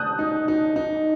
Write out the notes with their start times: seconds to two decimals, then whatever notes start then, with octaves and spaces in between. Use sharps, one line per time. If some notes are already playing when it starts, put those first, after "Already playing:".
Already playing: A5 D#6 F#6 G6
0.19 D#4
0.48 D#4
0.76 D#4